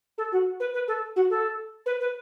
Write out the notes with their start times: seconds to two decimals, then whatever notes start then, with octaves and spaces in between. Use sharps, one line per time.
0.18 A4
0.32 F#4
0.60 B4
0.73 B4
0.87 A4
1.16 F#4
1.30 A4
1.86 B4
2.00 B4